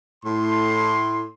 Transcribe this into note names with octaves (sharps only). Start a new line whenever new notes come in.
A2 C6